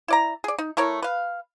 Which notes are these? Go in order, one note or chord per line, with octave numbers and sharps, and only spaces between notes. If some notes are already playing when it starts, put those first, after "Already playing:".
E4 D5 A#5
G#4 D5
D#4
A3 E4 A#4 C#5
B4 F5